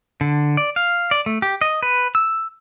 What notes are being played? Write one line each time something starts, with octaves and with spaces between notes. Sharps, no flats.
D3
D5
F5
D5
A3
G4
D#5
B4
E6